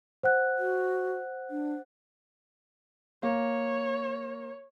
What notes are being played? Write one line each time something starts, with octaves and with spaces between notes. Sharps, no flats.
C5 F#5 F#6
F#4
D4
A#3 C#5